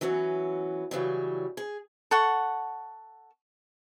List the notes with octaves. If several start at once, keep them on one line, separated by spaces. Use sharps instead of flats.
E3 F#3 B3 C#4
C#3 E3 F#3 G3
G#4
A4 F#5 C#6